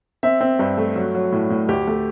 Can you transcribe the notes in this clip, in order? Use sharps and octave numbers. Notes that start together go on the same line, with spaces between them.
C4 E5
C4
G2
A3
F#3
F#3
A2
A2
D2 G4
A3